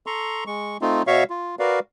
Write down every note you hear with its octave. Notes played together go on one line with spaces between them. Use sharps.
A4 A#5 C6 C#6
G#3 C#6
A3 C4 D#4 F4
B2 F#4 C#5 E5 F5 C#6
F4
F#4 A#4 B4 D5 F5